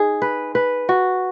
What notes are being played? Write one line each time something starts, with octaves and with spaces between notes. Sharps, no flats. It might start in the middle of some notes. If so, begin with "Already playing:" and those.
Already playing: D#4 G#4
B4
B4
F#4